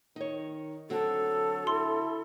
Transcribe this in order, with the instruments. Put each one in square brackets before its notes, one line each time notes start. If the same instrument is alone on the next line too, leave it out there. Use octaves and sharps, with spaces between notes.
[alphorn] D#3 [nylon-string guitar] D#4 C#5
[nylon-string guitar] D3 C4 F#4 [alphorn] F#3 [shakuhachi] A4
[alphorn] E4 [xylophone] C6